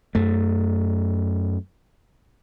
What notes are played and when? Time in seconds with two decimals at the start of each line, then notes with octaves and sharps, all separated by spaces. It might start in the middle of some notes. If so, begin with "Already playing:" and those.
0.15 F#2 A3